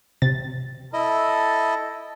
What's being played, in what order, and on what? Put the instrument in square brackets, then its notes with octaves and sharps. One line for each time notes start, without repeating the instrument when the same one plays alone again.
[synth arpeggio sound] C3 A6
[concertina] E4 D#5 [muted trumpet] A4